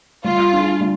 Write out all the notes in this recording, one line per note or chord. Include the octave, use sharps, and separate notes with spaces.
G3 F4
D4 G#4
G3